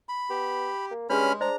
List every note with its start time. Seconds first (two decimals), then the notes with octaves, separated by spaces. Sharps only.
0.09 B5
0.30 B3 G4
0.91 A#3
1.10 G2 G#3 C#4 G#4 C#5 B5 F6
1.41 D4 C5 D#5 A#5